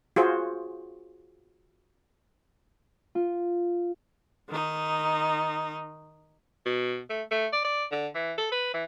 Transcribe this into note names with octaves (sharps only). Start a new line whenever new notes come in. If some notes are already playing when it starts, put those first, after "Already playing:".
F4 F#4 G#4 C5
F4
D#3 D#4
B2
A3
A3
D5
D5
D3
E3
A4
B4
E3